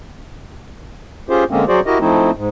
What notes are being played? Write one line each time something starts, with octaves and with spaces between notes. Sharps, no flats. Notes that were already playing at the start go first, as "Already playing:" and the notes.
C#4 F4 G4 G#4 C5
D3 G#3 A#3 C4 C#4
F#3 F#4 G#4 C5 D5
E4 F#4 G4 A#4 D#5
F3 A3 C4 D#4 E4
G#2